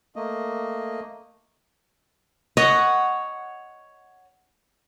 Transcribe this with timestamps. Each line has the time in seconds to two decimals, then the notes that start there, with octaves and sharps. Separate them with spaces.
0.16 A3 A#3 D#5
2.57 C#5 D#5 F#5